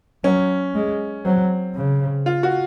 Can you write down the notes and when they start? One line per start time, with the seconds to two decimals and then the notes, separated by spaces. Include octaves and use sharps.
0.24 F#3 C#4
0.75 G#3
1.25 F#3 C4
1.75 C#3
2.26 F4
2.43 F#4